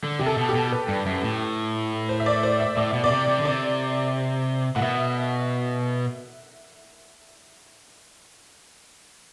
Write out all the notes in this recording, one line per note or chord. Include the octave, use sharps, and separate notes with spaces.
D3
C3 G4
A4
B2
G4
B2
B4
G2
F#2
A2
C5
E5
D5
C5
E5
A2 D5
B2 E5
B2 D5
C3
C3
D3
C3 D5
A2 F#5
B2 E5